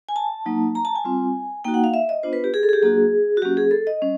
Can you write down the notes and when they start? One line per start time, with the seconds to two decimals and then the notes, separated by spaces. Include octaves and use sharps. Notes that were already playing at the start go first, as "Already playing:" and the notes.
0.09 G#5
0.16 A5
0.46 F#3 A#3 D#4
0.75 A#5
0.85 A5
0.96 G#5
1.04 G3 C4 F4
1.65 A#3 D#4 F#4 G5
1.74 F#5
1.84 F5
1.94 E5
2.09 D#5
2.23 B3 D4 F4 C5
2.33 B4
2.44 G4
2.54 G#4
2.63 A4
2.69 G#4
2.73 G4
2.82 F#3 A#3 D4 F#4 G#4
3.37 F#4
3.42 F#3 A#3 C#4 G4
3.57 G#4
3.71 A4
3.87 D#5
4.01 G3 C#4